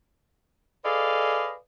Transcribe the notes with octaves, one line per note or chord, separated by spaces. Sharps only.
G#4 A4 B4 D5 D#5 F5